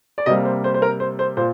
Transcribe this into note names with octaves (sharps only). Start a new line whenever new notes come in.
D5
C3 G3 A#3 D#5
C5
C5
C5
A#4
C5
C5
A#2 C5